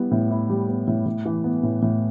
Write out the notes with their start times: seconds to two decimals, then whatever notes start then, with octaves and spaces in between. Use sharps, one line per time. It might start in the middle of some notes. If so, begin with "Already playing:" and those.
Already playing: G3 B3 E4
0.11 A2
0.31 E4
0.49 G3
0.68 B3
0.87 A2
1.06 A2
1.25 E3
1.44 B3
1.63 A2
1.82 A2